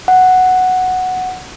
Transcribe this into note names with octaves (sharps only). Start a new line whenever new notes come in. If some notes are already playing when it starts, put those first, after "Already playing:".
F#5